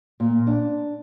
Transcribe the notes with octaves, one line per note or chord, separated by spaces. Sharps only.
A#2
D4